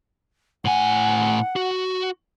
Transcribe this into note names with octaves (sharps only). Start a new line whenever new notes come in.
A2 F#5 G#5
F#4